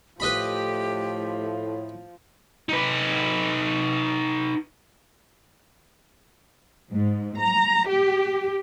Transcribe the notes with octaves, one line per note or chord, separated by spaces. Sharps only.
A2 F3 G4 B4 D#5 B5
D#4 B4
G#2
A#5
G4